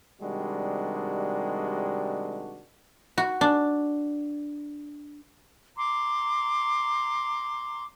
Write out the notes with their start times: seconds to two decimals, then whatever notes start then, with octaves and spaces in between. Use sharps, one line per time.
0.22 C3 D#3 G3 G#3 D4 F#4
3.18 F#4
3.41 D4
5.77 A#5 C6 D6